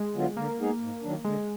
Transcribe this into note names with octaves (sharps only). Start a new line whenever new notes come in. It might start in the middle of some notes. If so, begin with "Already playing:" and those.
Already playing: G#3
D3 F#3 B3 F4
D3 A#3
G#3 B3 D#4 G#4
G#2
D#3 F#3 D4
D3 G#3